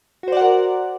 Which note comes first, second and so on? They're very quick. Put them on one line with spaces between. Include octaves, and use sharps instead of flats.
F#4 C5 D5 F#5 A#4